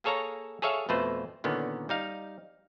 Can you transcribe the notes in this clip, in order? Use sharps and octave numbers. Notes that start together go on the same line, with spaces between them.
A#3 G#4 A4 C#5 F5 A#5
G#4 A4 C#5 E5 F5
F2 B2 A3 B4 C5
A#2 D3 D#3 B3 C#4
G3 D#4 F5